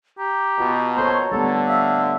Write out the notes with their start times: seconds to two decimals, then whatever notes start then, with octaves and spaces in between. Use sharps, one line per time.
0.18 G4 A#5
0.60 B2 F4
0.97 A#3 A4 C5 C#5
1.32 D3 G3 A3 B3 A4
1.68 E5 F5